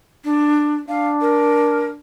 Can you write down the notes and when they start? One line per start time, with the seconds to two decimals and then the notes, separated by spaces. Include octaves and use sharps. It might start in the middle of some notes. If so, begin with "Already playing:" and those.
0.24 D4
0.88 D4 F5
1.21 A#4